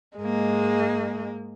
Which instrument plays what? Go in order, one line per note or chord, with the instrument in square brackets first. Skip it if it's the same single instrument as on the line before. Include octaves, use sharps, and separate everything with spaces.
[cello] G#2 A#3 [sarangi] G#3